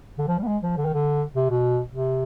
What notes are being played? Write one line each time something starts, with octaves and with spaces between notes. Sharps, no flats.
D3
F3
G3
B3
G#3
F3
D3
D#3
D3
C3
B2
C3